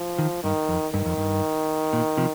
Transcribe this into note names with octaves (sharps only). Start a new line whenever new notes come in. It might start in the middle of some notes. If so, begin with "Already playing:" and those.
Already playing: F3
D#3
G2 D#3
F2
G2 D#3
F2
G2
A#2
C3 F3